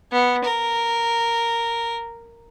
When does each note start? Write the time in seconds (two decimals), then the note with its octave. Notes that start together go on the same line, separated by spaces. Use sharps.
0.12 B3
0.45 A#4